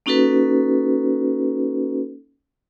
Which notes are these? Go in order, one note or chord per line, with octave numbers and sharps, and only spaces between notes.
A#3 C#4 D#4 F#4 A4 B4